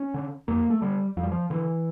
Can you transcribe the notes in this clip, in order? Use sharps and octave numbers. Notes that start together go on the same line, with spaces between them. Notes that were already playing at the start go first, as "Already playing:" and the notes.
Already playing: C#4
D3
F2 A#3
A3
D3 G3
F2 F3
G3
F3
D3 E3